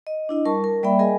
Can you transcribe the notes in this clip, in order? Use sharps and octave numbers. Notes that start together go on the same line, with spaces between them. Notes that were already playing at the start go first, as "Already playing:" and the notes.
D#5
D4 E4 D#5
G3 A#4 A5 C#6
A#4
G3 A#3 D5 E5 G5 B5
G#4 A#4 D#5 G#5